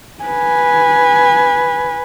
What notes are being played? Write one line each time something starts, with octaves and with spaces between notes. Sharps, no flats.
B4 G#5